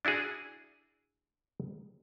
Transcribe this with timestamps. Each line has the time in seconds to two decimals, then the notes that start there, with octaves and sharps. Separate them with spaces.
0.05 D4 E4 F#4 G#4